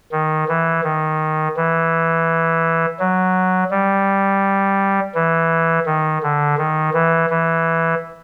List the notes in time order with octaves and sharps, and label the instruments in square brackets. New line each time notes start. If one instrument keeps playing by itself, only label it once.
[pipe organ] D#3
E3
D#3
E3
F#3
G3
E3
D#3
D3
D#3
E3
E3